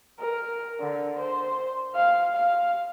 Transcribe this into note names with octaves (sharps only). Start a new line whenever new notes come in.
A#4
D3
C5
F5
F5